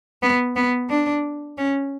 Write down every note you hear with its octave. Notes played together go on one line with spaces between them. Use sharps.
B3
B3
D4
C#4